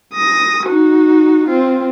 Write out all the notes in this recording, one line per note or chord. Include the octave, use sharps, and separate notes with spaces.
D#6 A#6
D#4 F#4
C4 F4